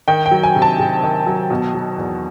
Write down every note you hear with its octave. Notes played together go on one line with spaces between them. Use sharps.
D#3 G5
G5
F#3
G#5
C3
A5
C3
D#3
F#3
B2
F#3
E2